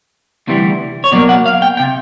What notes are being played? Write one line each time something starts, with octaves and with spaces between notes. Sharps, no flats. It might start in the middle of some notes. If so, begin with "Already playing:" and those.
D2 C3 E3 G3
C#5
B2 F#3 A#3 D5
F#5
F5
G5
C3 G5